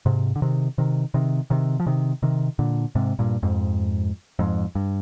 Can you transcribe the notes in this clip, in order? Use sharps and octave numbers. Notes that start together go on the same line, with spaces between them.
G#2 C3
D3
C3 D#3
C3 D#3
C3 D#3
C3 D#3
F3
C3 D#3
C3 D#3
A#2 D3
G#2 C3
G2 A#2
F2 G#2
F2 G#2
G2